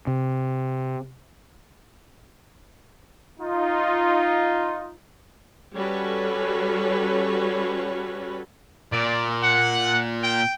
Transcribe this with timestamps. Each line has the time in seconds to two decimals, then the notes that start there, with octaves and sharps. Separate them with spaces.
0.07 C3
3.39 D#4 F4
5.74 G3 C#4 F#4 A4 B4 C#5
8.92 A#2 D5
9.44 F#5
10.24 G5